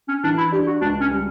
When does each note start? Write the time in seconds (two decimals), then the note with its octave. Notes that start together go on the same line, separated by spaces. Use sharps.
0.09 C#4
0.24 E3 D4
0.38 E4
0.52 D4 G4
0.67 F#4
0.81 C#2 D4
1.01 C#4
1.11 G3